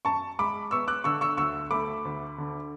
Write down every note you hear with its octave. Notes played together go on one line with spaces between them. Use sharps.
F#2 A5 C#6
G#3 B5 D6
B3 C#6 E6
D6 F#6
D3 C#6 E6
C#6 E6
D2 C#6 E6
A3 B5 D6
D2
D3